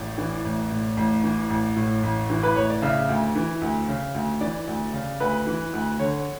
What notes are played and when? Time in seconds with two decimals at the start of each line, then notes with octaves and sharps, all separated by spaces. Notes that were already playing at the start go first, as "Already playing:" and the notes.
Already playing: A1 A2 D5
0.18 E3
0.45 A1
0.71 A2
0.97 A1
1.24 E3
1.50 A1
1.76 A2
2.03 A1
2.30 E3
2.43 B4
2.56 A1 C#5
2.70 D5
2.82 C#3 E5
3.09 D2
3.36 E3
3.61 D2
3.88 C#3
4.15 D2
4.41 E3 D5
4.67 D2
4.93 C#3
5.20 D2 B4
5.47 E3
5.73 D2
5.99 D3 C#5